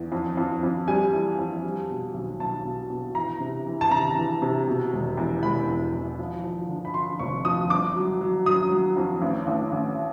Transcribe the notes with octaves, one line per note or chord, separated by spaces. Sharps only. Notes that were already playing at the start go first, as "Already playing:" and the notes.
Already playing: E2
F2
F2
F2
G3 G#5
E3
F2
G3
B2
B1
B1 A5
B2
B2
E3 A#5
C3
E3
A5
C3 A#5
E3
C3
B2
E1
E2
E1 B5
E2
E2
F3
F3
D3
B5
F3 C6
F1 C#6
F3 D#6
G1 D6
F#3
F#3
F#3 D#6
F#3
F2
A1
A1
A1